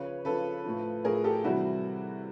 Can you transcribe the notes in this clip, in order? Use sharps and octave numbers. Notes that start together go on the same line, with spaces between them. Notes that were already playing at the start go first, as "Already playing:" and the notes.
Already playing: C#3 F3 B4 C#5
C#3 F3 A4 B4
A2 F3
A2 F3 G#4 A#4
G4 A4
C3 E3 G3 E4 F#4